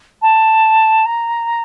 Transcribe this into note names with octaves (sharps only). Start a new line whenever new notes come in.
A5
A#5